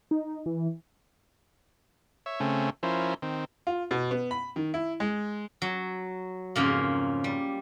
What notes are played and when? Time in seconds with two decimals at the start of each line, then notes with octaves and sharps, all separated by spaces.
0.11 D#4
0.46 E3
2.26 C#5 E5
2.40 C#3 A3 C4 C#4
2.83 F3 C#4 E4 A#4 C5
3.22 D#3 C4
3.67 F4
3.91 B2
4.11 B3
4.31 B5
4.56 D#3
4.74 E4
5.00 G#3
5.62 F#3
6.56 F2 G#2 C#3 A#3
7.24 G3